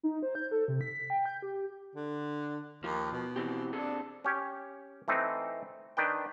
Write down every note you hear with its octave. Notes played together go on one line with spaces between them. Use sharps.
D#4
C5
G6
A4
C3
B6
G5
G6
G4
D3
D#2 F3
B2
E3 C4 G4
C4 D4 G#4 A4
C#4 G4 C#5
E3 A3 C4 D#4
D#3 D4 B4 G5